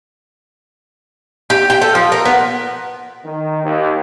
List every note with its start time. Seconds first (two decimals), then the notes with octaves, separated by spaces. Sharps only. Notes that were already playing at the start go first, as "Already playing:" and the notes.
1.50 G4
1.70 G5
1.82 A4
1.95 F3
2.12 A#4
2.25 B3
3.25 D#3
3.65 D#2